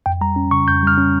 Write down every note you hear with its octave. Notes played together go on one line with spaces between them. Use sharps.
F2 G5
G3 A#5
C#4
C#3 C#6
F2 G6
G3 F6
C#4